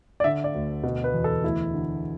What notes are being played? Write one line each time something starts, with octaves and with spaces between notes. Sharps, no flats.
D5
D3 E5
D5
D2
B2
B4
E2
A4
D2 E4
D3